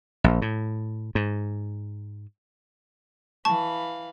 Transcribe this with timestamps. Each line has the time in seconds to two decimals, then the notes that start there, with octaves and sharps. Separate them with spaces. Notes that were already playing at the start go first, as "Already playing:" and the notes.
0.24 A#1
0.42 A2
1.15 G#2
3.45 E3 F5 A5 B5 C#6